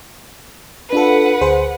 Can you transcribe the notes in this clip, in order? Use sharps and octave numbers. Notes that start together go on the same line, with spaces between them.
D4 F4 A4 B4 F#5
D2 G#4 C5